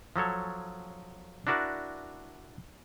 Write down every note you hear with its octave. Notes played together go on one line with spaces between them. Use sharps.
F3 F#3 A4 C#5
D4 E4 F#4 A#4 D5